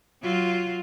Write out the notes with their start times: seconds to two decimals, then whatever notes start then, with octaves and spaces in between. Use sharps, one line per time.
0.23 F#3 F4